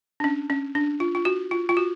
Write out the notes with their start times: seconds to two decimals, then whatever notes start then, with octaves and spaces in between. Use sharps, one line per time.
0.20 D4
0.24 C#4
0.50 C#4
0.75 D4
1.00 F4
1.15 F4
1.25 F#4
1.51 F4
1.69 F4
1.77 F#4